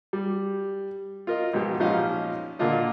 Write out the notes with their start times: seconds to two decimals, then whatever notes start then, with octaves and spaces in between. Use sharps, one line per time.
0.13 G3
1.27 F4 A#4 D#5
1.53 B1 G#2 F3 G4
1.80 A#1 F3 C#4 D#4 D#5 F5
2.59 A#2 D3 A#3 D4 F4 D#5